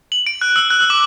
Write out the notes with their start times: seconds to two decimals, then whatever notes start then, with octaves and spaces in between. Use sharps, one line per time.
0.12 F#7
0.27 D7
0.41 F#6
0.56 E6
0.70 F#6
0.81 E6
0.90 D6